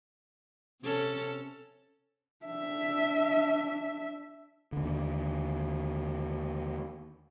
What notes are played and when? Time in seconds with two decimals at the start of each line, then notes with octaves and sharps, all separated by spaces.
0.83 C3 C#4 A4
2.45 D4 E5
4.72 D#2 D3